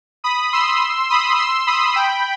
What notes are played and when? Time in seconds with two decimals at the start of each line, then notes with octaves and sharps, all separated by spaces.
0.24 B5 D#6
0.53 C6 E6
1.10 B5 D#6
1.38 C6 E6
1.67 B5 D#6
1.96 G5 B5